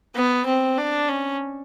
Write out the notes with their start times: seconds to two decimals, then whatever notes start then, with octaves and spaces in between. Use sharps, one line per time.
0.15 B3
0.46 C4
0.78 D4
1.09 C#4